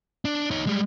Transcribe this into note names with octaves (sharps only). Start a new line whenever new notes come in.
D4
D#4 C#5
G3 G#3